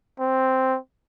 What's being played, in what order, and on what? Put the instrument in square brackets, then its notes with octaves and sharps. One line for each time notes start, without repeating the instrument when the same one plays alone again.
[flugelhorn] C4